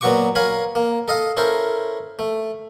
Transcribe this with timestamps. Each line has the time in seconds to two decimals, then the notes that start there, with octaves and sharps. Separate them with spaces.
0.01 A#2 F#3 B3 F#4 C#6 D6
0.35 A#4 C#5 F5 G#5 B5
0.75 A#3
1.08 A4 D#5 F5
1.37 C#4 E4 A4 A#4 C5
2.19 A3